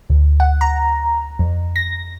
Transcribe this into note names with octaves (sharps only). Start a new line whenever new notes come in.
D2
F#5
A#5
F2
A#6